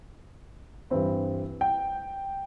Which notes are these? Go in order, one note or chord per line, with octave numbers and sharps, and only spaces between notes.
G2 E3 C4 E4
G5